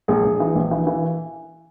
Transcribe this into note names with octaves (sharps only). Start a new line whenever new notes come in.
A#1 G#4
A#1
E3
A#1
E3
E3